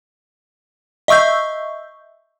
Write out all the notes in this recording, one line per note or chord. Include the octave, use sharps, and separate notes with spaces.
D#5 E5 C#6 E6 G6